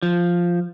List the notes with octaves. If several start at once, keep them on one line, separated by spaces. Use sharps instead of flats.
F3